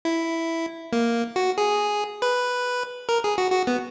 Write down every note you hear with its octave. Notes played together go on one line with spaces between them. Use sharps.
E4
A#3
F#4
G#4
B4
A#4
G#4
F#4
F#4
B3